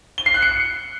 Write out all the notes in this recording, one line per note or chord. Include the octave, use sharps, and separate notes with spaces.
G7
C7
F#6
C#7